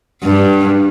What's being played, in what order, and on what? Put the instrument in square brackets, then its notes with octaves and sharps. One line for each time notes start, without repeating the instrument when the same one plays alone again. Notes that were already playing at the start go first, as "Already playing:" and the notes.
[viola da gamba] G2